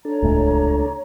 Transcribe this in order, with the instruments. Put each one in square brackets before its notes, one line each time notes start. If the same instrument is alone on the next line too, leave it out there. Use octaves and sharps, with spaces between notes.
[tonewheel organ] D4 A4 [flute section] C#5 A#5
[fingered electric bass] D#1 A2 [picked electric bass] C#2 G#3 A3